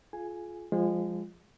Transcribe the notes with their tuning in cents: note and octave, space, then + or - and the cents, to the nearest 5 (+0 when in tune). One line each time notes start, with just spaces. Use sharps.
F4 +0 G#4 +35 G#5 +0
F3 +0 G#3 -25